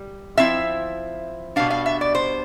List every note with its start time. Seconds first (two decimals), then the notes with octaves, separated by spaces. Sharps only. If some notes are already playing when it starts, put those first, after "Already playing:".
Already playing: G3
0.38 F3 C4 E4 E5
1.56 B2 G3 B3 D4 F5
1.70 F5
1.86 E5
2.01 D5
2.15 C5